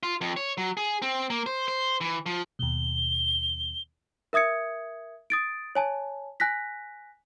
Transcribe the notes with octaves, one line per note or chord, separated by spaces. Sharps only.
F4
F2
C#5
F#3
G#4
C4
A#3
C5
C5
E3
F3
D#2 B2 G7
A#4 E5 D#6 G#6 C#7
D#6 A6 D7
C#5 G#5 A5
G#5 F#6 A#6 B6